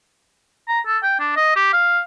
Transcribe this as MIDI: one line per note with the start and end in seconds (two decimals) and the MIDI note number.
0.68 0.80 82
0.86 0.98 69
1.03 1.16 79
1.20 1.36 62
1.36 1.54 75
1.56 1.73 67
1.73 2.00 77